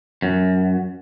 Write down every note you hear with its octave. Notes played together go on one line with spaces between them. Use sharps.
F#2